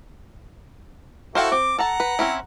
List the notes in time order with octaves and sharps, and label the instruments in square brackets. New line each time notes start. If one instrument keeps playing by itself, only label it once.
[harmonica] E4 F#4 A4 [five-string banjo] C5 F5 G5
[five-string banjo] C4 [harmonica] D6
[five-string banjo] A4 A5 [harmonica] F#5 A#5
[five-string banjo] B4
C4 C#4 E4